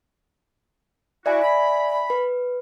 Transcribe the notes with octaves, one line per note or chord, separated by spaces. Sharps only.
E4 F#4 D5 E5 G#5
B5
B4